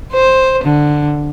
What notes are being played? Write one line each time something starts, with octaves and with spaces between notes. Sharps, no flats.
C5
D3